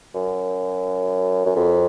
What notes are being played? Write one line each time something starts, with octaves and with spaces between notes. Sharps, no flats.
F#2
F#2
F2